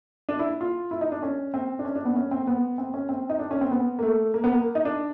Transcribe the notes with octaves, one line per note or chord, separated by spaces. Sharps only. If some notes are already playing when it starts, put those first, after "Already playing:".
D4
E4
F4
E4
D#4
D4
C#4
C4
D4
C#4
D4
B3
C#4
C4
B3
C4
C#4
C4
D#4
D4
C#4
C4
B3
A#3
A3
A#3
B3
A#3
D#4
D4